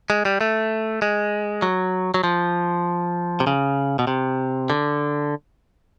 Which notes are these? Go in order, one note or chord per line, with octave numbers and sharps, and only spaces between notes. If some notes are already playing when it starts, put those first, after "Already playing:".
G#3
G3
A3
G#3
F#3
F#3
F3
C3
C#3
B2
C3
D3